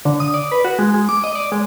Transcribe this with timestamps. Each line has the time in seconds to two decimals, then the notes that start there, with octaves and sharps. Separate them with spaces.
0.05 D3
0.20 D#6
0.34 D5
0.52 B4
0.65 F#4
0.79 G#3
0.94 G#3
1.09 D6
1.24 D#5
1.35 D5
1.52 G#3